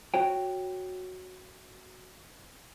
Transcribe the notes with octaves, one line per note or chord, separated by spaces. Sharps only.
F#4 C#5 G5